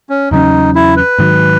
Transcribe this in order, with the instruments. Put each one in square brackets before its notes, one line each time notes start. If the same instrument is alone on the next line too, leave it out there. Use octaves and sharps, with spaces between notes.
[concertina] C#4
[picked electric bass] E2 C#3 F#3 C#4 [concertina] D#4
[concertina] E4
B4
[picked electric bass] G#2 D#3 F#3